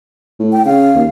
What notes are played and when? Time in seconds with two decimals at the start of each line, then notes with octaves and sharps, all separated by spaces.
0.40 A2
0.52 G5
0.66 C#3 F5
0.95 D#2